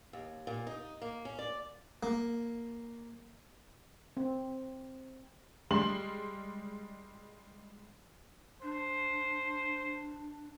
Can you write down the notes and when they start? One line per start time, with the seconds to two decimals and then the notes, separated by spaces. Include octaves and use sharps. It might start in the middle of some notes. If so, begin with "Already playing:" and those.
0.13 D#2
0.47 A#2
0.67 D#4
1.02 A#3
1.25 C#4
1.39 D5
2.03 A#3
4.17 C4
5.71 G3 G#3 C6 F#7
8.62 D4 C5